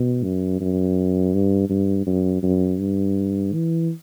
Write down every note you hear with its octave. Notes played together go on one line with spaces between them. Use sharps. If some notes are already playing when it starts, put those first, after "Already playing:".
Already playing: B2
F#2
F#2
G2
G2
F#2
F#2
G2
E3